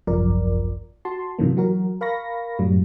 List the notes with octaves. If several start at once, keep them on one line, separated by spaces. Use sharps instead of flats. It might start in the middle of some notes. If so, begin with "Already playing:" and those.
G#1 C#2 F#2 F3 A#4 D5
F#4 A5 C6
G#2 C3 D#3 E3 F#3 A#3
E3 F#3 F#4 A#4
A#4 F5 B5 C#6 A#6
F#2 A2 F#3 G3